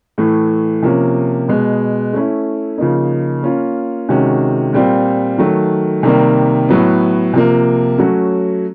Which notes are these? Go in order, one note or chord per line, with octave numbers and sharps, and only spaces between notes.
A2 E3 A3
C3 F3 A#3 C#4
B2 G#3 B3
A3 C#4 E4
C#3 F3 A#3 D#4
A#3 C#4 F4
C3 D#3 G#3 C#4 F#4
A#2 G3 C4 F4
D#3 F#3 A3
C3 D#3 G3 A#3
A2 F#3 B3
C3 F3 A#3
F#3 A3 C#4 F#4